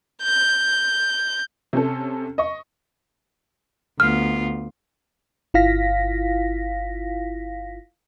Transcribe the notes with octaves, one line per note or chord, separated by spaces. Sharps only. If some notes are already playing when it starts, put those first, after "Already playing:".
G6
C3 C#4 A4
D#5 C#6
D2 B3 F4 F6
G1 E4 F4 F5 A#6 B6